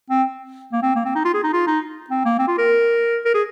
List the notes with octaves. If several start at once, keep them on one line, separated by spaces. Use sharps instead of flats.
C4
A#3
C4
A#3
C4
D#4
F4
G#4
D#4
F4
D#4
C4
A#3
C4
F4
A#4
A#4
G#4